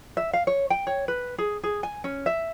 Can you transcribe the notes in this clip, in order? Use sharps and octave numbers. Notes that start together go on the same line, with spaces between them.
E5
F5
C#5
G5
C#5
B4
G#4
G#4
G#5
C#4
E5